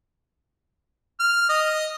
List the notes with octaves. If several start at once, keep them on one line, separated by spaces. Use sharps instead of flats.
F6
D#5